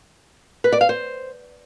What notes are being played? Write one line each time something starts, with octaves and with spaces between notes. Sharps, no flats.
B4
D5
F5
C5